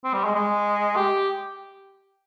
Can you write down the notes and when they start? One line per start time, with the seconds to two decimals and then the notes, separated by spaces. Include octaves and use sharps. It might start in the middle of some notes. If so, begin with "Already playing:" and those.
0.04 C4
0.14 G3
0.25 G#3
0.35 G#3
0.96 G4